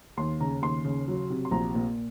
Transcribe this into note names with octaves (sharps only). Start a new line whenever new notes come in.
D#2 C6
C#3 A#5
D#2 C6
C#3
F#3
C3
C6
A#1 A#5
A#2